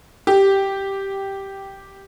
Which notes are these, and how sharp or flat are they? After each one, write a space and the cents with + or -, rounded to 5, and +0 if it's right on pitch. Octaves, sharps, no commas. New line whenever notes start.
G4 -5